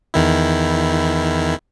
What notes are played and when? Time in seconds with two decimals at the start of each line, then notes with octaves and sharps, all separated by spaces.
0.14 E2 D#3 E4